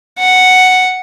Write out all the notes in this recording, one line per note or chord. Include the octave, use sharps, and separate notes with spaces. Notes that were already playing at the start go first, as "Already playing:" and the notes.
F#5